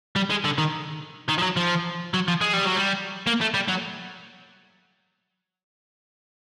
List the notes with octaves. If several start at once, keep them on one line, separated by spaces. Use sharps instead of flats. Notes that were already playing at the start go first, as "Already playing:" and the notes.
G3
G#3
D3
D#3
D#3
F3
F#3
F3
F#3
F3
G#3
G3
F#3
G3
A#3
A3
G3
F#3